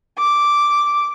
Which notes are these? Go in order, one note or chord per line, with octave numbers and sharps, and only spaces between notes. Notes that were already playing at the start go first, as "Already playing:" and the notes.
D6